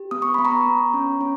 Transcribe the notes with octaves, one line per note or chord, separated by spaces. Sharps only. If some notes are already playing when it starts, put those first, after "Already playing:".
Already playing: G4
B3 D#6
C#6
B3 B5
A#5 C#6
B3
C#4
C#4